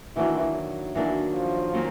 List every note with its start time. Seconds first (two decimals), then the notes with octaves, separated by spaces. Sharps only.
0.16 D#3 E3 F#3 A#3 D4 F#4
0.95 D#3 E3 F#3 A#3 D4 F#4
1.34 F3
1.73 D#3 F#3 A#3 C#4 F4